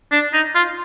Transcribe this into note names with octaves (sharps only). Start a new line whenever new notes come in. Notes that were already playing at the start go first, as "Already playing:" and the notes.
D4
D#4
F4